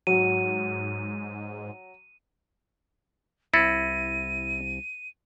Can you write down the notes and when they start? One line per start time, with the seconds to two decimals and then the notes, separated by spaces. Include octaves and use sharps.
0.07 G#2 F#3 D#7
3.54 C2 E4 A6 A#6 C#7 D#7